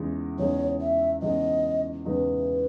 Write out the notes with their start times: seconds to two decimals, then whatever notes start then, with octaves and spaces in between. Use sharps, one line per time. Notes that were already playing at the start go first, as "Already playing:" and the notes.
Already playing: E2 C#3 G#3 D#4
0.39 E2 C#3 G#3 D#4 C#5
0.81 E5
1.22 E2 C#3 G#3 D#4 D#5
2.05 E2 C#3 G#3 D#4 B4